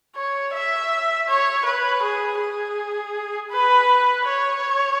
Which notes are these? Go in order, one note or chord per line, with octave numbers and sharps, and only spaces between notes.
C#5
E5
C#5
B4
G#4
G#4
B4
C#5